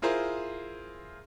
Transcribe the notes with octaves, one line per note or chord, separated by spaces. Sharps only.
E4 F4 G#4 A#4 C5